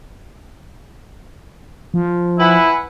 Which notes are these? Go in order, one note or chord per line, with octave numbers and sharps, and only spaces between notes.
F3
E4 B4 F#5 G#5